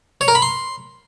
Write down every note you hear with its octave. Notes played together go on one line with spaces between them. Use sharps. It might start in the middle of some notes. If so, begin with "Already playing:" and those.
C#5
A#4
B5
C6